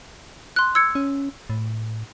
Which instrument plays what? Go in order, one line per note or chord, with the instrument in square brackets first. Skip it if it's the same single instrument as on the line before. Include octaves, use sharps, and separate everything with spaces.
[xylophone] C6 F#6
E6 G#6 C#7
[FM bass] C#4
A2